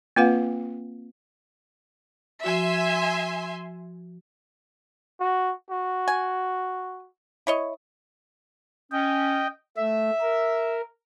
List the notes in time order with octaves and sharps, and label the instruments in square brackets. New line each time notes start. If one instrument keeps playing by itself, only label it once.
[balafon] A#3 C4 F4 B4 F5 F#5
[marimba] F3 F#4 [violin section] E5 G#5 C6
[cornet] F#4
F#4
[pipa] G#5
E4 C#5 D#5
[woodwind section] C#4 [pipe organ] D#5 G5
[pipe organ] A3 [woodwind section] E5
[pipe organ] A#4